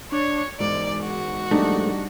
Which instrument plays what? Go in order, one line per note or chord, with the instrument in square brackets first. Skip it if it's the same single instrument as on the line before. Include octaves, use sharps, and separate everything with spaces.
[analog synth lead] D4 [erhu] C#5
[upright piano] E1 [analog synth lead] G#2 [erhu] D5
[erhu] F#4
[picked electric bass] A#1 A3 [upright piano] G3 D4 D#4